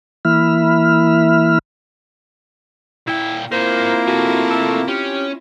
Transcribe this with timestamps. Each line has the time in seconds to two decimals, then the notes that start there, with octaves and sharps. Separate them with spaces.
0.25 E3 A#3 E4 E5 B5 F6
3.07 A#2 E4 G5
3.52 A#3 C4 E4 F4 A#4 C5 G#5
4.07 C3 A3 F#4
4.50 A4
4.88 C#4 G4